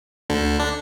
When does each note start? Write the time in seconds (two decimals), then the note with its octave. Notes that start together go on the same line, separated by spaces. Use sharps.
0.30 D2 D3
0.60 D4